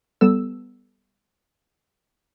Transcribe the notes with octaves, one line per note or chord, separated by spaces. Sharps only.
G3 B3 A4 E6